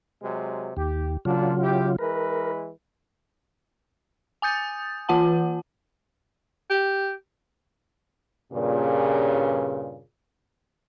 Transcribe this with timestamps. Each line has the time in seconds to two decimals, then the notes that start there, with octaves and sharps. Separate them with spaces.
0.22 C3 F#3 G#3
0.77 D#2 G4
1.25 A#2 C#3 F#3 D4 F4
1.60 E4 G4
1.99 E3 G#3 A#4 B4
4.42 G#5 D#6 G6 A6
5.09 E3 F4 F#5 A5
6.70 G4
8.52 G2 A#2 C#3